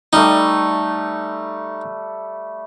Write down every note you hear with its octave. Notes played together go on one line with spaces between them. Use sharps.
G3 A3 D#4